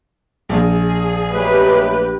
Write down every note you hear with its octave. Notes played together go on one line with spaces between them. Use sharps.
A#1 G#4
B2 F#3 A3 G4 B4